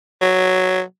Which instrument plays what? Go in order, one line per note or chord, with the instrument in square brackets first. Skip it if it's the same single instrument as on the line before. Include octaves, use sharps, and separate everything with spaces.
[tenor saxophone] F#3